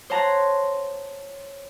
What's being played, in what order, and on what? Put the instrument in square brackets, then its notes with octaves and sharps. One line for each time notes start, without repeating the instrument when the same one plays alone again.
[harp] C5 C#5 F#5 A5 A#5 C6